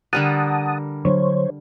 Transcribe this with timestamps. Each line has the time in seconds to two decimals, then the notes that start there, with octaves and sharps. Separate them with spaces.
0.13 D3 G3 A#4 F#5 A5 D#6
1.05 D3 F#3 D4 C5 C#5